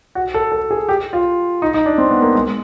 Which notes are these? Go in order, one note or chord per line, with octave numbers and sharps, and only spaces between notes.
F#4
A4
A4
G#4
G4
F4
D#4
D#4
D4
C4
B3
A#3
G#3